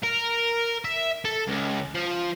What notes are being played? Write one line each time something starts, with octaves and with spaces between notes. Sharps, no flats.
A#4
E5
A4
C#2
F3